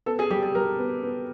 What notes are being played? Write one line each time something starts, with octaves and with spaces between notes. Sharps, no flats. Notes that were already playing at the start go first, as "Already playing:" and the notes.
B3 A4
G#4
G3 G4
G#4
G3 A#4
B3
B3